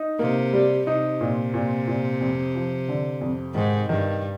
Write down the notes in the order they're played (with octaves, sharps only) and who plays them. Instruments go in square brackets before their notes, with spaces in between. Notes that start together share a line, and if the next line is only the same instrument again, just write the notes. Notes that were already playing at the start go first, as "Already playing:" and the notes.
Already playing: [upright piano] D#4
[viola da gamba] C3 [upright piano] A#3
[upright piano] G3
[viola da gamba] C3 [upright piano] D#4
[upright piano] A#2
A#2
A#2
F2
F3
D3
F2
[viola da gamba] G#2 [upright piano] D#3
[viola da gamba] G2 [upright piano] D#3